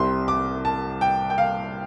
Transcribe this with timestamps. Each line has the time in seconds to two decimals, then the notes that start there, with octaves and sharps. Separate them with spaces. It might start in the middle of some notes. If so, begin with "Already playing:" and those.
Already playing: C2 C3 G3 C4 C6
0.28 D6
0.65 A5
1.01 G5
1.30 G5
1.38 F5